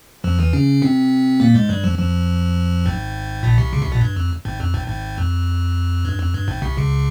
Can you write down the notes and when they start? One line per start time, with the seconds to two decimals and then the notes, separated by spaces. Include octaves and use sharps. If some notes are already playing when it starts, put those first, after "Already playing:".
0.24 F2 F3
0.39 E2 E3
0.53 C#3 C#4
0.82 C3 C4
1.40 A#2 A#3
1.54 G#2 G#3
1.69 G2 G3
1.84 F2 F3
1.99 F2 F3
2.86 G#1 G#2
3.43 A#1 A#2
3.58 C2 C3
3.73 C#2 C#3
3.82 C2 C3
3.92 A#1 A#2
4.01 G2
4.16 F2
4.45 G#1 G#2
4.60 F2
4.74 G#1 G#2
4.88 G#1 G#2
5.18 F2
6.05 G2
6.19 F2
6.34 G2
6.48 G#1 G#2
6.62 C2 C3
6.77 C#2 C#3